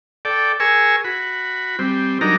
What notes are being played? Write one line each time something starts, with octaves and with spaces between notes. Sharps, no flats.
A4 D5 G5
G#4 A#4 G#5 C#6 E6
F#4 B5
G3 C4
F#3 G3 D4 D#4 A#4 A#5